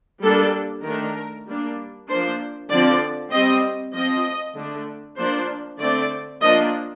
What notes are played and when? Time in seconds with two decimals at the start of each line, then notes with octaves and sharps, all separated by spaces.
0.22 G3 A#3 D4 A4
0.84 D#3 A3 D4 A#4
1.46 G3 A#3 D4
2.08 F3 A#3 D4 C5
2.70 D3 F3 C4 D5
3.32 G3 C4 D#5
3.94 F3 C4 D#5
4.55 D3 A3 D4
5.17 F3 A#3 D4 C5
5.79 D3 A3 C4 D5
6.41 F3 A#3 D4 D#5